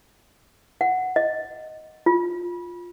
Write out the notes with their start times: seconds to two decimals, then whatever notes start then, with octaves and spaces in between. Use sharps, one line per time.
0.81 F#5
1.16 D#5
2.06 F4